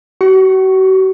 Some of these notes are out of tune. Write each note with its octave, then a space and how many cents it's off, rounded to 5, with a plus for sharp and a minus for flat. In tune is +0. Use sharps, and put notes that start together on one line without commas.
F#4 +40 C#6 +0